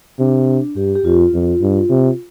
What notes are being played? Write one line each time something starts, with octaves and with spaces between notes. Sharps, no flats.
C3 D4
G2 G4
G4
F2 F4
F2
G2
C3